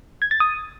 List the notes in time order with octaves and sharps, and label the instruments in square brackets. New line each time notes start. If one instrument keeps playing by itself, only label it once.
[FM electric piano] G#6
A6
D#6